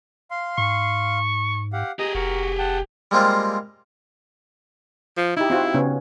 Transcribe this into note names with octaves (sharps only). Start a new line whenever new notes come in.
F5 C6
G#2 C#6
G4 F5 F#5
G4 G#4 D#5 G#5 A#5
F1 F#4 A#4
F#5 G5 A5
G3 G#3 A#3 C4 F4
F3
D#4 E4 G4
C4 F4 F#4
C#3 B3 C#4